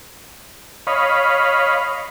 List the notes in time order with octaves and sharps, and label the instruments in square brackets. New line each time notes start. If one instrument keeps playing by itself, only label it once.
[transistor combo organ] C#5 D#5 F5 B5